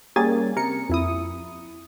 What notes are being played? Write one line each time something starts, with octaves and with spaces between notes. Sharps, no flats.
G3 A#3 C#4 G#4 G#5 A6
C3 A#4 C#7
F2 E4 D#6